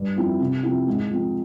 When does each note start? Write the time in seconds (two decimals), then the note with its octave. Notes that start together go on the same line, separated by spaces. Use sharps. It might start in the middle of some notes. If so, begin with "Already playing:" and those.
Already playing: G2
0.16 F3 C4 E4
0.40 C3
0.63 F3 C4 E4
0.87 G#2
1.10 F3 C4